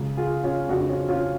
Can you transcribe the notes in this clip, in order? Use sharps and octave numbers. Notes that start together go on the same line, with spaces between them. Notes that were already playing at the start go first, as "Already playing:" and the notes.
Already playing: C#2 C#3
F4 G#4
C#4 F4
F2 C#3 D4 F#4
C#4 F4
C#4 F4